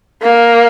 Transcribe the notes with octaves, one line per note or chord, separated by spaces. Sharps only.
A#3